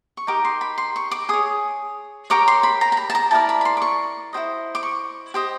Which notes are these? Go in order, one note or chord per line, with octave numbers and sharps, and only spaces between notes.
C#6
D#4 G4 A#4 D6
C6
B5
C6
C#6
D6
G#4 C#5 D#6
G4 A#4 C#5 D6
C6
B5
A#5
A#5
B5
A5
A#5
E4 G4 A#4 D5 A5
B5
B5
C6
D6
C#6
E4 G4 C5 D#5
D6
C#6
G4 C5 D#5